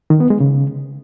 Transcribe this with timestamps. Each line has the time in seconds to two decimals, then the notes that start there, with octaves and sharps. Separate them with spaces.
0.10 D#3
0.20 B3
0.30 G#3
0.40 C#3